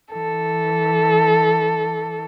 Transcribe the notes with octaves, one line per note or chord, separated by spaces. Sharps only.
E3 A4